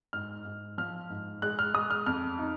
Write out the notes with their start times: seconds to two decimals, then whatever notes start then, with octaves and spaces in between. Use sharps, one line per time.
0.13 G#2 F6
0.45 G#2
0.78 F3 F6
1.10 G#2
1.42 G#3 F#6
1.59 F6
1.74 G#3 D#6
1.91 F6
2.06 F2 F6
2.39 D#4